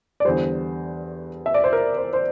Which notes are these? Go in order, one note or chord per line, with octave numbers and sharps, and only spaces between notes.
D5
E2 D3 G3 C5
E5
D5
C5
A#4
C5
C5